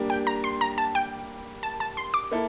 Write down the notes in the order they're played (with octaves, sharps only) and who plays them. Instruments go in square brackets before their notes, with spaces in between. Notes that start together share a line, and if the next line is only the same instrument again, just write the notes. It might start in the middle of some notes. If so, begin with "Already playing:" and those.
Already playing: [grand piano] G3 A#3 D4 G4
[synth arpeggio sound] G5
A#5
C6
A#5
A5
G5
A5
A5
C6
D6
[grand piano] A#3 E4 A4